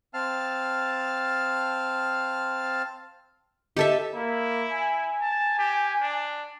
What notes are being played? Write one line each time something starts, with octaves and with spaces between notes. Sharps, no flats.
C4 F5 A5 F6
G4 A4 D#5 E5
A#3 E4
G#5
A5
G4
D4